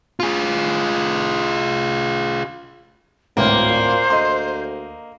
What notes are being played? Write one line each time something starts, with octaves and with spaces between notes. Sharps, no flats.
F4 G#4
G#1 D2 A2 A#3 B3 C5
A#2
D2 D#5 C6